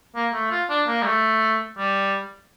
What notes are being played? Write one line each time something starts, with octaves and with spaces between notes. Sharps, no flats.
A#3
A3
F4
D4
A#3
G3
A3
G3